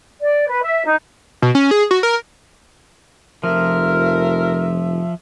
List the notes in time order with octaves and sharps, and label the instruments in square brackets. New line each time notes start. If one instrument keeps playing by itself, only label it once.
[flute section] D5
B4
E5
D#4
[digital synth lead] B2
C#4
G#4
F#4
A#4
[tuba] F1 [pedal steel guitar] F3 [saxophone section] A#4 [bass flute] E5